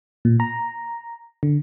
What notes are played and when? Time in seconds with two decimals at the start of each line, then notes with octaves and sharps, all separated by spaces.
0.25 A#2
0.40 A#5
1.43 D3